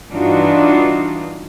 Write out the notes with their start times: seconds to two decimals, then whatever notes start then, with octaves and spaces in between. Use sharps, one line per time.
0.12 G2 E3 D4 D#4 F4 F#4